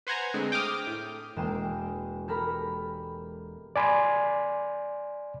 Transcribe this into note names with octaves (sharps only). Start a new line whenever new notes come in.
B4 C5 F#5 G#5 A#5
D3 G#3 A3 C4
G5 D6 D#6 F6
A2
E1 G#3 A#3 G5 E7
G4 A4 A#4 B5 B6
D5 G#5 B5 C6